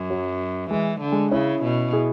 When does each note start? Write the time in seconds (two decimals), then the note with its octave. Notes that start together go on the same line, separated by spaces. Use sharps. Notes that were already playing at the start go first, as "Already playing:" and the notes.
Already playing: F#2
0.10 F#3
0.71 E3 G#3
1.01 D3
1.12 G#3
1.32 C#3 C#4 E4
1.63 B2
1.92 E4 G#4